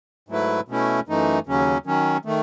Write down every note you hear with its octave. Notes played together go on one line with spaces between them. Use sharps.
G#2 F#3 A3 E4 B4
B2 A3 C#4 E4
F#2 E3 A3 D#4
D#2 C#3 F#3 C#4
D#3 F#3 C#4
D#3 A3